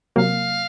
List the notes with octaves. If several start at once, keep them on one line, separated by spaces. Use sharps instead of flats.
C3 F#3 A#3 F5